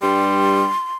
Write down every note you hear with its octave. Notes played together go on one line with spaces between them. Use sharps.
G2 G3 C6